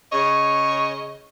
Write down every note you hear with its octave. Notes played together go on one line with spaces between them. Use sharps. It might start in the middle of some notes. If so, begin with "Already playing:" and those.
C#3 C#5 D#5